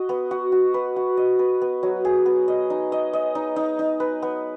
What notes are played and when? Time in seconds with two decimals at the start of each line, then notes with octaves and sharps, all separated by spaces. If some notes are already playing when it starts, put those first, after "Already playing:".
Already playing: F#4 D#5
0.09 B3
0.31 F#4
0.52 F#4
0.74 B4
0.96 F#4
1.17 D#5
1.39 B4
1.61 B3
1.83 F#3
2.05 G#4
2.26 B3
2.48 D#5
2.70 D#4
2.92 D#5
3.13 D#5
3.35 D#4
3.56 D#4
3.79 D#4
4.00 B4
4.22 B3